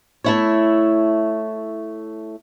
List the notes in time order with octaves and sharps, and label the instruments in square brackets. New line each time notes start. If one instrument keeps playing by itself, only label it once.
[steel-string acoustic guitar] A3 E4 C#5